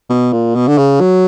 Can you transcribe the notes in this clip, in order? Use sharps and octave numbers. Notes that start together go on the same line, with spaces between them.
B2
A#2
B2
D3
C#3
F#3